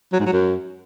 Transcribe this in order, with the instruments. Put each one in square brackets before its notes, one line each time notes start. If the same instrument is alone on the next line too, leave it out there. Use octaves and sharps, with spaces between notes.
[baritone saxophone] F#3
G#2
F#3
F#2